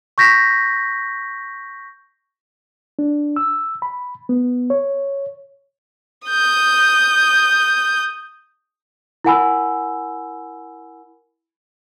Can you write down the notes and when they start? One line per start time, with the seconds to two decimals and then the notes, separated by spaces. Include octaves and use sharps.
0.18 C#6 G6 A#6 B6
2.99 D4
3.36 E6
3.82 B5
4.29 B3
4.70 C#5
6.28 D#6 G6
9.25 E4 A#4 F#5 G#5 B5 E6